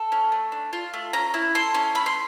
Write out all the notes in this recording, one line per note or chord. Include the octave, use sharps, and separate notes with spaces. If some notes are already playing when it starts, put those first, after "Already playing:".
Already playing: A4
C#4
A3
D4
F4
A3
C#4 A#5
E4
A4 C6
C#4
A3 B5
C6